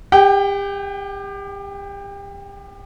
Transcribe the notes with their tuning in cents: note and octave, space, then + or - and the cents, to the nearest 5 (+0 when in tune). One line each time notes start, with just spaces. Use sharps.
G4 +30 G5 -30